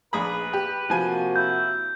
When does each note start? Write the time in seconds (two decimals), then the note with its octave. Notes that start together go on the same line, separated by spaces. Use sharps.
0.13 A#1 G#4 B4 B5
0.53 G4
0.90 C3 F3 A#3 F#4 G#5
1.36 E4 G6